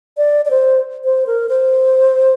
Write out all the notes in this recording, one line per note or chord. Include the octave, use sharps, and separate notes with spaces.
D5
D5
C5
C5
A#4
C5